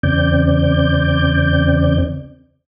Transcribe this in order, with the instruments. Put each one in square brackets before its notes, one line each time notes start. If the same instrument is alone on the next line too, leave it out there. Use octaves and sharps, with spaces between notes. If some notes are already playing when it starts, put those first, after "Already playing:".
[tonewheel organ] E2 C#3 C4 D5 G6